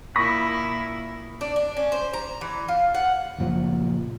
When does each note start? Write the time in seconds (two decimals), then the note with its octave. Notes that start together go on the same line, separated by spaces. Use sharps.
0.16 A#2 E4 B5 C#6 D#6 A#6
1.41 D4
1.56 D4
1.77 C#4
1.92 C5
2.13 A#5
2.41 E3
2.68 F4
2.94 F#5
3.38 F#1 A#2 F3